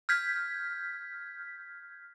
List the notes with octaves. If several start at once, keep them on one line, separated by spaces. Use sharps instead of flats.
F6 G6 G#6 B6